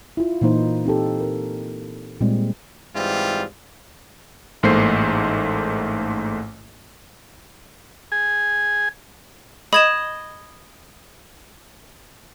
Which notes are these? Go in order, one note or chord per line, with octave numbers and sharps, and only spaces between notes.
E4 F4
A#2 E3 A#3 D#4 C5
C4 D#4 G4 A4
A#4
A#2 G3 G#3 C4
G#2 E3 G3 C4 F4
A1 G#2 A3 A#3 C5 C7
G#4 G#5
D#5 B5 G#6 E7